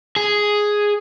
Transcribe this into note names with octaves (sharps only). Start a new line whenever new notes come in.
G#4